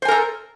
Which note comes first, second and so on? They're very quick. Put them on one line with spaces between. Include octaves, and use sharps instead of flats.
C5 G#5 A#4 A4